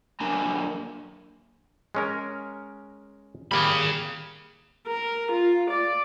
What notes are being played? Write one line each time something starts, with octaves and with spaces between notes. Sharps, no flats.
F#2 A#3 D4 G#5 A#5
G#3 C#4 A#4
G3 A#3 G#4 B5
A#4
F4
D5